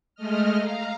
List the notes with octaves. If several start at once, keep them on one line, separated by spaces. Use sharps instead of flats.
G#3 A3 D#5 F6
F5 A#5